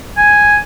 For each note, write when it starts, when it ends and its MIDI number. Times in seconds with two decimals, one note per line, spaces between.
0.17 0.58 80